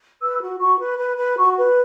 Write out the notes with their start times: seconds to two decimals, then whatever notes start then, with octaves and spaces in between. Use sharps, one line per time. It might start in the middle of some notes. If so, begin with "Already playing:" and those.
0.21 B4 E6
0.41 F#4
0.60 F#4 C#6
0.80 B4
0.98 B4
1.18 B4
1.37 F#4 C#6
1.56 B4